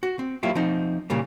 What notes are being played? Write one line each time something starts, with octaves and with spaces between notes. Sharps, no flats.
F#4
C4
F#3 A#3 E4 F4 G4
F3 C4 D#4
A#2 C#3 E3 G3 A#3